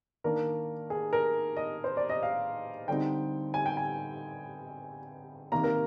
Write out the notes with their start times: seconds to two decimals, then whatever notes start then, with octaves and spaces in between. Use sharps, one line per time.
0.24 D#3 A#3 D4 A#4
0.90 G#4
1.13 A#4
1.57 D#5
1.84 C5
1.97 D5
2.10 D#5
2.23 F5
2.88 D3 G3 C4 D#4 G5
3.54 G#5
3.66 G5
3.77 G#5
5.52 C3 D#3 A#3 A#5
5.64 A#4